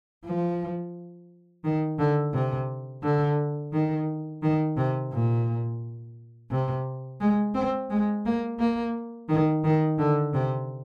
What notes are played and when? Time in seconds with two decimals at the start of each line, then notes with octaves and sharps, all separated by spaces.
0.25 F3
1.64 D#3
1.99 D3
2.34 C3
3.03 D3
3.73 D#3
4.43 D#3
4.77 C3
5.12 A#2
6.51 C3
7.21 G#3
7.55 C4
7.90 G#3
8.25 A#3
8.59 A#3
9.29 D#3
9.64 D#3
9.99 D3
10.34 C3